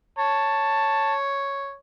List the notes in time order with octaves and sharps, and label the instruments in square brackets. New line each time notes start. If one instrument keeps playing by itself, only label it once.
[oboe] C#5 [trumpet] A5